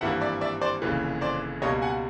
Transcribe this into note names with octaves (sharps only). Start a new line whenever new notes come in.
G#1 G2 E3 G3 A#3 E5 F#5
D5 E5
D5 E5
C5 D5
F1 D#2 C#3 E3
C5 D5
C#2 B2 G3 A#3 C#5 D#5
F#5 G#5